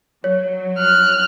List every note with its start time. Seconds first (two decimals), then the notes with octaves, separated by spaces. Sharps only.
0.24 F#3 C#5
0.78 F6 F#6